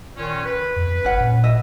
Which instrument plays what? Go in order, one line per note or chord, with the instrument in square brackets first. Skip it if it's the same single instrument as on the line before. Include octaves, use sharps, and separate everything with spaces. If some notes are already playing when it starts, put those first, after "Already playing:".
[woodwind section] A#2 D#3 C#4
B4
[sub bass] F2
[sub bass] G#1 [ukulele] C#4 F#5
[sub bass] A#2
[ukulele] D#5 E5